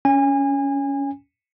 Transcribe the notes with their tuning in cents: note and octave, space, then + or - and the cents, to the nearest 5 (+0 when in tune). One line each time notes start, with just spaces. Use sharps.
C#4 +15 G#5 -30